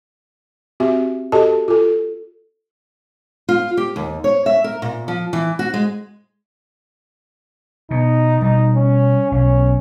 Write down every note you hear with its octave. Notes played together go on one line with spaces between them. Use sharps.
C4 F#4 G4 E5
F#4 G4 A4 D#5 A5
F4 A4
F4
G4
D#2
C#5
E5
A#4
A#2
F3
E3
F#4
G#3
B2 D#4
B2 G3 D#4
C#4
B1 C#4